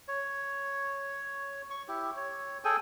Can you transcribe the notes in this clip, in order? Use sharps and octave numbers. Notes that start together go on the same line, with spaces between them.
C#5
C#6
E4 G4
C#5
G#4 A4 G5 G#5